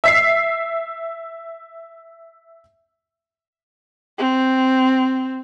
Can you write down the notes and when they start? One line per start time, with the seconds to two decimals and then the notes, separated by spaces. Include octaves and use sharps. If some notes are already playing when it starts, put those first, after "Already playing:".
0.04 E5 B6 C7
4.18 C4